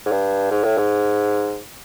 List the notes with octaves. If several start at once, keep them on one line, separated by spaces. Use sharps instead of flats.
G#2
G2
G#2
A2
G#2